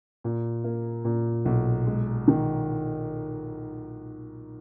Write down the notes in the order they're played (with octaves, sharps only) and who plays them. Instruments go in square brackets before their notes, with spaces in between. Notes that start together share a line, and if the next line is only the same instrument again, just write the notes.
[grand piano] A#2
A#3
A#2
B1
G#3
D#3